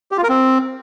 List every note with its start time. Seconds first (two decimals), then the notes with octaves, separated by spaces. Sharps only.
0.12 G4
0.18 F4
0.23 A#4
0.29 C4